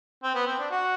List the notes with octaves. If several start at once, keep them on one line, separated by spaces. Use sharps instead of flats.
C4
B3
C4
D4
F#4